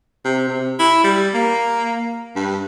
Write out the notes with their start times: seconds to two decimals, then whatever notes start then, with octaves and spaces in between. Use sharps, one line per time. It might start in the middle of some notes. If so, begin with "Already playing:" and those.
0.25 C3
0.47 C3
0.79 E4
1.04 G3
1.34 A#3
2.36 G2